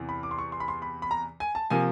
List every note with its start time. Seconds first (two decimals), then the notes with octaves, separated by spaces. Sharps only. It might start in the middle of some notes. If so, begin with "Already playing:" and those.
Already playing: E2 C3 E3
0.09 B5
0.23 D6
0.31 C6
0.38 C#6
0.52 C6
0.60 B5
0.68 C6
0.82 B5
1.02 B5
1.11 A#5
1.40 G#5
1.55 A5
1.70 C3 F3 A#3 G#5